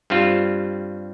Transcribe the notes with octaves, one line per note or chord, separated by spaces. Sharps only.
G2 G3 C4 F4